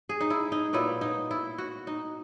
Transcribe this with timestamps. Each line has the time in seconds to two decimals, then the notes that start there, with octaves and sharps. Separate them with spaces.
0.09 G#4
0.21 D#4
0.30 E4
0.52 D#4
0.73 A#2 F#3 B3 D#4 E4
1.01 D#4
1.31 E4
1.58 F#4
1.87 D#4